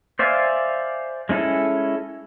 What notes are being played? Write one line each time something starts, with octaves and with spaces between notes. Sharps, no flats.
C5 D5 E5 F5 G#5
G#3 C#4 E4 A4